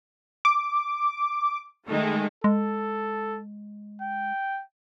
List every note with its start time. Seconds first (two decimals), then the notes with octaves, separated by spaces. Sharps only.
0.45 D6
1.88 D#3 G#3 A3
2.44 G#3 A4
4.02 G5